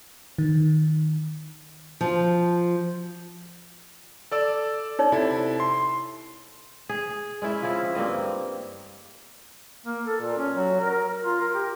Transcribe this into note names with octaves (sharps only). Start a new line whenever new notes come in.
D#3
F3
A4 D5 E6
D#4 C#5 D5
C3 E4 A4
C6
G#4
G#3 C#4 E4 E5
F3 C4 C#4 E4
G2 A#3 C4 D#5
A#3
A4
A#2
C#4
F#3
A#4
F4
A#4
G4